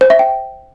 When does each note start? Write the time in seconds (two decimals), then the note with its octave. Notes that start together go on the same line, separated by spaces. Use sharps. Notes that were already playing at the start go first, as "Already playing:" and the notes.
0.01 C5
0.10 E5
0.19 G5